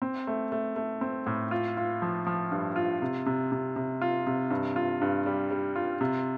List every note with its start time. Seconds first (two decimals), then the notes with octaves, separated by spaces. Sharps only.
0.02 C4
0.27 A3
0.52 A3
0.76 A3
1.01 C4
1.26 A2
1.51 F4
1.77 F4
2.02 F3
2.27 F3
2.52 G2
2.76 F4
3.02 C3
3.26 C3
3.52 C3
3.76 C3
4.02 F4
4.27 C3
4.50 G2
4.76 F4
5.01 G2
5.26 G3
5.51 G3
5.76 F4
6.01 C3